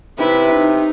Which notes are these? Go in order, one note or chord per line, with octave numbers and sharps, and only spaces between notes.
C3 E4 B4
D#4